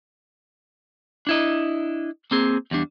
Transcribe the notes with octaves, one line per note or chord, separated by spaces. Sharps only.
D4 E4 D#5
A#3 C4 G#4
E2 G3 D4